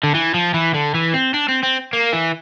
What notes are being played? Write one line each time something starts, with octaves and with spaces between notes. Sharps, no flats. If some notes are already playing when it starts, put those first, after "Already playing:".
D3
E3
F3
E3
D3
E3
C4
D4
C4
C4
A#3
E3